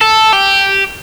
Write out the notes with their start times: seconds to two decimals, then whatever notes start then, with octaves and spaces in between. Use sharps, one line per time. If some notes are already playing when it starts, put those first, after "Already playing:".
0.01 A4
0.32 G4